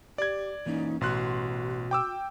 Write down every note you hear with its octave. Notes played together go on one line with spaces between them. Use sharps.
G4 D5 G#6
E3 A#3 C#4 D#4
A1 B2 F#4 C6 F#6
G5 D6 E6